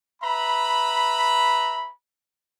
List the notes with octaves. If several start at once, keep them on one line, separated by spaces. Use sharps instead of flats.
B4 E5 A#5 B5